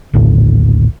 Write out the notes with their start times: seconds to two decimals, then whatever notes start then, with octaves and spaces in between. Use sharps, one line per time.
0.13 A#1 D#2 A2 D3